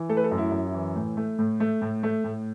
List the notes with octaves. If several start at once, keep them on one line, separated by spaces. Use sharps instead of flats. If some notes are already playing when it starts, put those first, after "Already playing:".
Already playing: E3
A3 A4
B4
A4
F#2
E4
F#2
E4
E3
A2
A3
A2
A3
A2
A3
A2